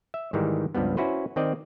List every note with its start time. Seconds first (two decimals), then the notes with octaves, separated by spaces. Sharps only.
0.14 E5
0.33 G#2 D#3 E3 G3
0.75 C#2 G2 F3 G3 B3
0.97 C#4 E4 F#4 B4 C5
1.36 D#3 C4 D5 D#5